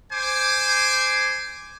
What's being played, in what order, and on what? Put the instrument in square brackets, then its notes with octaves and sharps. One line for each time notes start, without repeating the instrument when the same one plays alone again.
[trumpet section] C5 G#5 D6